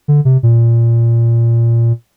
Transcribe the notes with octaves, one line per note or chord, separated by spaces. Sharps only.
D3
C3
A#2